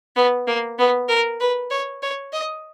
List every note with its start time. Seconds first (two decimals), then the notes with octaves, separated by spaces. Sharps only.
0.16 B3
0.47 A#3
0.79 B3
1.09 A#4
1.40 B4
1.71 C#5
2.02 C#5
2.32 D#5